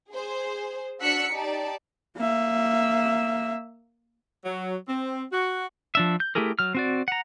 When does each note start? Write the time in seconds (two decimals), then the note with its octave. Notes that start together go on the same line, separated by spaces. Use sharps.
0.11 G#4 C5
1.02 D4 F#4 E6 F#6 B6 C#7
1.32 D#4 G4 D5 A5
2.17 A#3 E5
4.45 F#3
4.89 C4
5.32 F#4
5.95 F3 D4 E5
6.20 G6
6.35 A3 E4 G4 G#4 A#4
6.59 F#3 F6
6.75 C4 F#4 D5
7.08 F#5 A#5